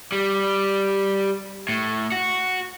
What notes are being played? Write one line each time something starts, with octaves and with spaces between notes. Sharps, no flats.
G3
A2
F#4